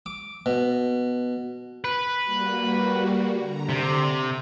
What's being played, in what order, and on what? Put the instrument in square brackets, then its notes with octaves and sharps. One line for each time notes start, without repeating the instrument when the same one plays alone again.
[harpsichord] D6
B2
[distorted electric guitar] B4
[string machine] G3 A#3 F#4
D3 A#5
[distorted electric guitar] C3